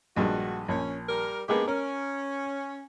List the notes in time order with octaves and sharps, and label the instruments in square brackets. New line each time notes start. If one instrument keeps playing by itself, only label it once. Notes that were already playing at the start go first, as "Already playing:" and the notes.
[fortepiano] A#1 G2 G#3 [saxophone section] F#4
[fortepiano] A#1 [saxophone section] C#4
[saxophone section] G3 A#4
[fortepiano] G#3 A#3 B3 [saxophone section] D4 G4 G#4
[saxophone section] C#4 [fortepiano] A#4